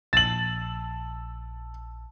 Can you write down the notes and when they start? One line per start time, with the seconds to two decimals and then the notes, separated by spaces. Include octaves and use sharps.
0.13 A#1 A5 E6 A6 F#7